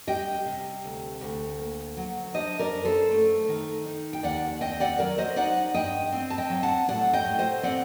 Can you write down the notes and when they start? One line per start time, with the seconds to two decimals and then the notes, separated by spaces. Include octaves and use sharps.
0.07 G3 D#5 G5
0.46 C3
0.84 D2
1.21 D2
1.59 A#3
1.97 F#3
2.34 D4 C5 D#5
2.59 A#4 D5
2.73 F#2
2.85 A4 C5
3.11 A3
3.48 D#3
3.85 D#4
4.13 G5
4.23 D#2 D5 F#5
4.61 C4 D#5 G5
4.80 D5 F#5
4.99 F#3 A#4 D5
5.18 C5 D#5
5.36 D#4 D5 F#5
5.74 G2 D#5 G5
6.12 C4
6.30 A5
6.38 D#5 G5
6.50 F#3
6.63 F#5 A5
6.88 A2 D5 F#5
7.13 D#5 G5
7.26 A2
7.39 C5 D#5
7.63 C4 D5 F#5